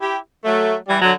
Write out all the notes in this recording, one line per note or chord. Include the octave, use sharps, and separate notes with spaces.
E4 G4
F#3 A3
E3 G3
D3 F#3